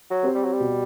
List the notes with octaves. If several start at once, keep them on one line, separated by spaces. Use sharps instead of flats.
F#3
C4 G4 C5
G3
F#3
G3
B2